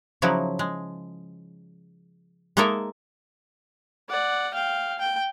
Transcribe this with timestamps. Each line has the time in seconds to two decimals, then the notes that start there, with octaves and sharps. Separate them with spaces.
0.22 C#3 F3 F#3 D#4 E4
0.59 G#3
2.57 G#3 A#3 D#4 A4 A#4 E5
4.09 D5 F#5
4.54 F5 G5
4.98 G5